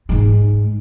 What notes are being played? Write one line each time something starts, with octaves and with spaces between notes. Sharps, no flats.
G#2 G#3